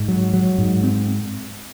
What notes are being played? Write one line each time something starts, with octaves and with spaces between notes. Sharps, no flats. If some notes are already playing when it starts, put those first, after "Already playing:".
Already playing: G#2
F#3
F#3
G#2
C4